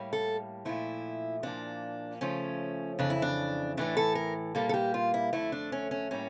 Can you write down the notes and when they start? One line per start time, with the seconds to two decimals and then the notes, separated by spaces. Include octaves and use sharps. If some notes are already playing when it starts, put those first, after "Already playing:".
Already playing: A2 G3 A#3
0.13 A4
0.65 A#2 F3 A3 E4
1.43 A#2 F3 A#3 D4
2.21 C#3 F3 A3 C#4
2.99 F2 C#3 E3 D4
3.10 E4
3.22 D4
3.77 A2 E3 A3 D4
3.97 A4
4.15 A#4
4.55 A#2 G3 A#3 A4
4.69 A4
4.74 G4
4.94 F4
5.14 E4
5.33 F2 D3 A3 E4
5.52 D4
5.72 C#4
5.91 C#4
6.11 A2 G3 A#3 C#4